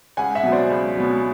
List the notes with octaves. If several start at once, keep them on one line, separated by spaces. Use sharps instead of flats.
C#2 F#5 G#5
E5 F#5
B2 F#3
C5 D5
C#2
B2 F#3